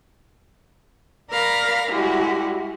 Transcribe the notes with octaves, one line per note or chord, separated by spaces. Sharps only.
A#4 D5 F5 B5 F6 A#6
G3 G#3 E4 F#4 G4